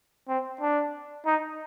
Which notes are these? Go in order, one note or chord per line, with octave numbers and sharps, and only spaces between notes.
C4
D4
D#4